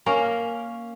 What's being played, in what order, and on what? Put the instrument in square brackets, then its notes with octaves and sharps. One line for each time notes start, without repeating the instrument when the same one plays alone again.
[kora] A#3 C#4 A#4